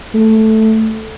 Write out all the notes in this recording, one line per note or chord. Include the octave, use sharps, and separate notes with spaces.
A3